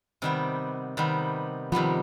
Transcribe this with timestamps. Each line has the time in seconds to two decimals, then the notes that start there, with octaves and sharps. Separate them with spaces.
0.22 C3 D#3 G3 B3
0.97 C3 D#3 G3 B3
1.72 C3 D#3 F3 G3 B3